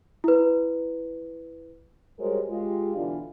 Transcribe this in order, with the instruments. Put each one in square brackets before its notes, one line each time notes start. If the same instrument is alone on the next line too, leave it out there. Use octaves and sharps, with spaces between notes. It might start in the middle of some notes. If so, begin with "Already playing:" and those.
[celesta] E4 B4
[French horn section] G3 G#3 F#4 A#4 C5 C#5
G#3 F4 G4
B2 D3 E3 D4 F4